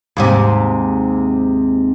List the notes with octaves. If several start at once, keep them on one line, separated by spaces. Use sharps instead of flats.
D#2 G#2 C3